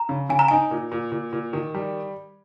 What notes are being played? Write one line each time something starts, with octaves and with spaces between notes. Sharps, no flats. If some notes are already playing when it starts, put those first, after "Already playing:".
Already playing: A#5
C#3
C#3 G#5
A#5
D#4 G#5
A#2
A#2
A#2
A#2
D#3
G3